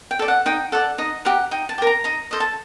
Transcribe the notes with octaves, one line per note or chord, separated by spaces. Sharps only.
G5
A4 D5
F#5
D#4 G5
A4 D5 F#5
D#4 D#5
G4 A#4 F#5
D#4 G5
A5
G4 A#4
A#5
D#4 A#5
A4 C5 D#5
A5